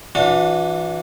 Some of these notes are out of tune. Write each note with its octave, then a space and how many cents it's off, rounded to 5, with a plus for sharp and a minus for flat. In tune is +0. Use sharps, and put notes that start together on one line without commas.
E3 +0 D4 +0 F#4 -40